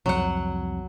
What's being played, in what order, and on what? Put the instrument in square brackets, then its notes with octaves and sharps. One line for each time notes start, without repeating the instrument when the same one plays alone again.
[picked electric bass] C2 F2 [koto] F#3 F#5